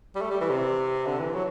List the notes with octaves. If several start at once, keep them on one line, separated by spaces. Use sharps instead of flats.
G3
A3
G3
E3
C3
D3
E3
F#3